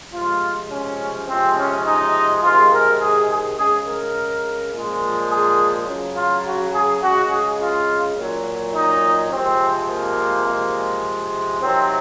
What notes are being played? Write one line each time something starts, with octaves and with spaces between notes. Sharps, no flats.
C3 F3 G#3 F4
C#4
C3 F3 G#3 C4
C#4
D#4
C3 D#3 G#3 F4
A#4
G#4
G#4
C#3 G#3 G#4
A#4
A#2 F3 G#3
G#4
C#3 F#3
F4
F#4
G#4
C#3 G#3 F#4
G#4
F4
A#2 F#3
D#4
C3 F3 G#3 C4
A#3
C3 F3 G#3
C3 D#3 F#3 C4